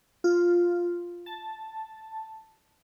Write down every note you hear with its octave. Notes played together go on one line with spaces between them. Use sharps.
F4
A5